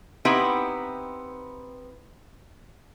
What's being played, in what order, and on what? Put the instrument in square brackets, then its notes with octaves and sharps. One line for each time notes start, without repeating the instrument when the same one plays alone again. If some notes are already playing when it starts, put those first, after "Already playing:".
[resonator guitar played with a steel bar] B3 C4 D#4 E4 G4 B4